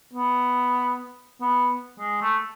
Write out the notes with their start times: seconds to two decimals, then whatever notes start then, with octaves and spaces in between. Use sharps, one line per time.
0.13 B3
1.41 B3
1.99 G#3
2.22 A3